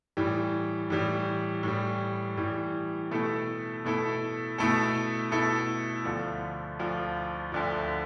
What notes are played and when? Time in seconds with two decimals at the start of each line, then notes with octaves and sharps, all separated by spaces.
0.17 A2 E3 G3
0.90 A2 E3 G3
1.63 A2 E3 G3
2.37 A2 E3 G3
3.11 B2 A3 E4 A4
3.84 B2 A3 E4 A4
4.58 B2 A3 E4 A4
5.32 B2 A3 E4 A4
6.05 D2 D3 F3
6.79 D2 D3 F3
7.52 D2 D3 F3